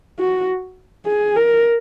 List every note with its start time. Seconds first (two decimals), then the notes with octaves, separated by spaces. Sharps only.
0.19 F#4
1.06 G#4
1.36 A#4